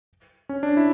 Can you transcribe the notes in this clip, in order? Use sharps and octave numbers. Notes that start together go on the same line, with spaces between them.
C#4
D4
E4